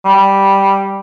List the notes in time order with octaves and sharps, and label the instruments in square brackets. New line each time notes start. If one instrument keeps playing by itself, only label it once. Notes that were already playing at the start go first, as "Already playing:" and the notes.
[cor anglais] G3